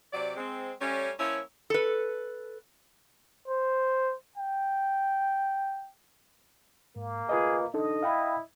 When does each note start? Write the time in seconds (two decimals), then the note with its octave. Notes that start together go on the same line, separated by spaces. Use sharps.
0.13 C3 F#3 D5
0.36 G#3 C4
0.81 G3 A3 C#4
1.19 F3 A#3 C#4 E4 C#5
1.70 A4 B4
3.48 C5
4.37 G5
6.96 G#2 A#3
7.29 F4 G#4 B4 D#5
7.74 D4 D#4 A4 D#5
8.03 E4 F5 G5 B5